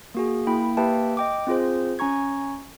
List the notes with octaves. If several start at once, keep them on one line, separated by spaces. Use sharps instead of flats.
A#3 F#4 G#4
A#3 E4 G5 B5
A#3 G4 B4 E5 G5 A5
D#5 G5 D6
C4 F4 G#4 C5
C#4 G#5 A#5 C#6 G#6